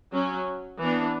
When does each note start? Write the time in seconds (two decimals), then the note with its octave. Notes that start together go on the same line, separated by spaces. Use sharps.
0.12 F#3 C#4
0.80 E3 B3 D4